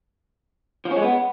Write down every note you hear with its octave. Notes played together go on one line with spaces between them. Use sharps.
F3
C#4
G#3
B3